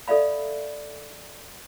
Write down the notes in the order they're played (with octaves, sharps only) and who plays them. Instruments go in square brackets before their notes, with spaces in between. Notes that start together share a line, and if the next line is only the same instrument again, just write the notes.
[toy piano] A4 D5 E5 F5 B5